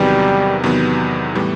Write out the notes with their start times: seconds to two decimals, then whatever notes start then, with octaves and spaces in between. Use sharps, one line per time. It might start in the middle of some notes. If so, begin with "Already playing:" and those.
Already playing: E2 C3 D#3 F#3 G3 B3
0.63 E2 C3 D#3 F#3 B3
1.35 A2 E3 G3 B3